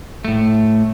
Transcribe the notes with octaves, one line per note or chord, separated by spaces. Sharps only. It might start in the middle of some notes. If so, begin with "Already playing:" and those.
A2 A3